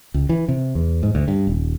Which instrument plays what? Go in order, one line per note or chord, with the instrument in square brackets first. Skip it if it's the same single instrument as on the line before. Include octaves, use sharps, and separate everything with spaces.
[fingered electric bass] C#2
E3
C3
E2
G#2
D2
G2
D#1